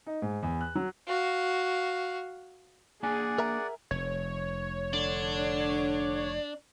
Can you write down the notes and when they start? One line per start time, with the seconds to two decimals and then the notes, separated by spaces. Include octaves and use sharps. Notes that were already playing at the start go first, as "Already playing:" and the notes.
0.07 D#4
0.22 G#2
0.42 E2
0.61 F#6
0.75 F#3
1.07 F#4 F5
3.03 A#3 D4 G#4 D5 F#5 G#5
3.38 A#4 E5 A#5
3.91 F1 C#5
4.93 D3 D4